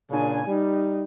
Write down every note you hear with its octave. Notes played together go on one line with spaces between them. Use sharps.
A#2 C#3 D4 G#5
G3 D#4